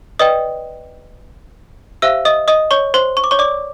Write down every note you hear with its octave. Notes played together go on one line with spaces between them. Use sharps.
B4 D5 D#5 G5 D#6
G4 C5 E5 F5 E6
D#5 D#6
D#5 D#6
C#5 C#6
C5 C6
C#6
D6
C#5 C#6
D5 D6